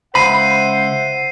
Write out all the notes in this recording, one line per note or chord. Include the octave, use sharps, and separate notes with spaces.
C#2 C5 E5 F#5 B5 C7 D#7